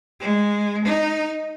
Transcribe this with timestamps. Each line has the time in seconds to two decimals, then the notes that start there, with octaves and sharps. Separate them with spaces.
0.20 G#3
0.84 D#4